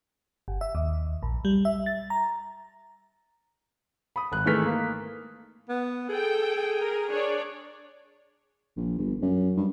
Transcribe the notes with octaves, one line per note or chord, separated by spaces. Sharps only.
G1
E5
D#2
A#1
G3
E5
A6
A#5
B5 D#6
G#1 F#6
D#3 E3 G#3 A3 F6 B6
A#3
B3
G#4 A4 G5
A#4
D4 C#5 D5
A#1
G1
F#2
G2